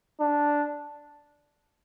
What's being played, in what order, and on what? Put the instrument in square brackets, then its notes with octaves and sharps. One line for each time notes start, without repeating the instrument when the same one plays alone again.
[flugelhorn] D4